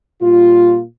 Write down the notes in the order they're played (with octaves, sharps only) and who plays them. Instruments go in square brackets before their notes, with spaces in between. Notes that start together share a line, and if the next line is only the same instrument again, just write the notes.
[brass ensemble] A#2 G3 A#3 F4